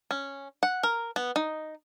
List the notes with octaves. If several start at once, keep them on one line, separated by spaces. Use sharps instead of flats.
C#4
F#5
A#4
B3
D#4